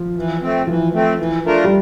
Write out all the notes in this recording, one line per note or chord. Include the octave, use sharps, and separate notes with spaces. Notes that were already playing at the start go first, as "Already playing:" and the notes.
Already playing: F3
E3
A3 C4
E3 F3
A3 C4
E3
A3 D4 F4 A#4
G3